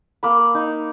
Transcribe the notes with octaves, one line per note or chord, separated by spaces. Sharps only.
A#3 B5
D#4